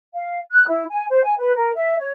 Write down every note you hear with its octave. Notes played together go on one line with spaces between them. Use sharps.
F5
F#6
E4
G#5
C5
G#5
B4
A#4
E5
C#5